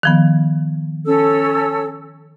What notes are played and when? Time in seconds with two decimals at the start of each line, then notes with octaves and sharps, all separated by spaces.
0.03 D#3 F3 B3
1.06 C#4 A4 E6